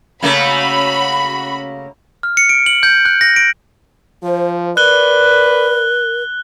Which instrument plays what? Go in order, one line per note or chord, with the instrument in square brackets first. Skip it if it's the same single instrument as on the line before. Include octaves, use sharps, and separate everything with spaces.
[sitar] C#3 A3 A#3 [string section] F#4 B5
[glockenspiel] F6
C#7
D7
F#7
G6
F#6
A#6
D7
[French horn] F3 [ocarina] C5
[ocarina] A#4 [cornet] B4 [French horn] D5 [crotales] F#6 G7